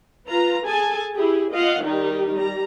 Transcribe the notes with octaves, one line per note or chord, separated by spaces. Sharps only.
F4 B4 A#5
G#4 A4 G#5 A5
E4 G4 G#4
F4 D#5 F5 F#5
D#3 G3 D#4 G4
G3 A#5